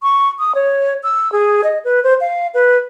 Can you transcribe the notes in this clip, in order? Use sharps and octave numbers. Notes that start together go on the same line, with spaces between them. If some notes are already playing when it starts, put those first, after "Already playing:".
C#6
D#6
C#5
E6
G#4
D#5
B4
C5
F5
B4